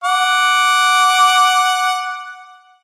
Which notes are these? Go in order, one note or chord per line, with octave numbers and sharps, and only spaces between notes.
F#5 D6